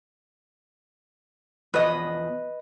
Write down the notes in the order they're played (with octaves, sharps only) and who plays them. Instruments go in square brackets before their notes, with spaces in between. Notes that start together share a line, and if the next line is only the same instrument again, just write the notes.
[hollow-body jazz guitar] E2 B2 F3 [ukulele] B4 D#5